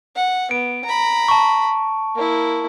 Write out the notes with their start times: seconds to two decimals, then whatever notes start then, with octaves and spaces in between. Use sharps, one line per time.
0.16 F#5
0.51 B3 D7
0.85 A#5 B5
1.28 A5 C#6
2.15 A#3 E4